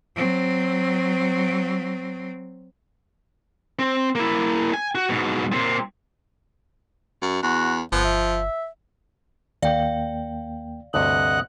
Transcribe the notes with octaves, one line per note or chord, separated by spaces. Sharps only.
F#3 C4
C4
A#3 E4
G#5
F#4
G#2 B2
A#2 C4
F#2
E2 F#4
G1 F3 B3
E5
D#2 A#3 D5 F5 G5
D2 G2 C3 D#5 F#5 F#6